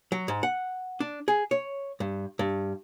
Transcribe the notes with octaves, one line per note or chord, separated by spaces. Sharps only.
F#3
G#2
F#5
D4
G#4
C#5
G2
G2